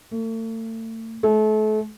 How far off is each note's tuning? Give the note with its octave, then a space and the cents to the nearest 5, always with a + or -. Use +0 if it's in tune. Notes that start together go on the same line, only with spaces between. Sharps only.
A3 +40
A3 -35